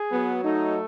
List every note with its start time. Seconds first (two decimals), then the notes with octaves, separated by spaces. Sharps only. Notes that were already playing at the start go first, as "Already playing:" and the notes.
Already playing: G#4
0.10 F#3 B3
0.43 A3 D#4